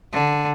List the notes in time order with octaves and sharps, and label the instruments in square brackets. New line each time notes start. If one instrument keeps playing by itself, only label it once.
[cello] D3